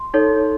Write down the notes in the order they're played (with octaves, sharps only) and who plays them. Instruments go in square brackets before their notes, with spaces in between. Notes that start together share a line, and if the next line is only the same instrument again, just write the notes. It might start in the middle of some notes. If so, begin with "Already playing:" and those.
Already playing: [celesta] C6
D#4 A4 C#5